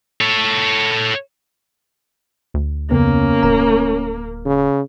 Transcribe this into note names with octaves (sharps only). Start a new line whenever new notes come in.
A4 C#5
D2
F2 C#3 A#3 B3 C#4
D1 A#4 A#5
C#3